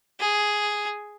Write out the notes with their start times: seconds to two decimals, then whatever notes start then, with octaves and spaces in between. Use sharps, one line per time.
0.19 G#4